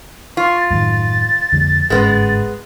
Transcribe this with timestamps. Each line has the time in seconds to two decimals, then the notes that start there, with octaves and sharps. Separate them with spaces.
0.37 F4 C#6
0.57 A6
0.70 F#2 A2 D#3 A6
1.52 F2 D3 F3
1.90 G1 G#2 G#3 A#3 B3 C#4